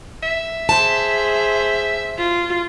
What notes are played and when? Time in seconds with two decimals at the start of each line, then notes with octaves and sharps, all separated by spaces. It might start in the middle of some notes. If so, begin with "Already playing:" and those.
0.23 E5
0.69 G#4 C5 A5
2.18 F4